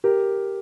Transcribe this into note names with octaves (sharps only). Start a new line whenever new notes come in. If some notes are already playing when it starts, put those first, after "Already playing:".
G4 A#4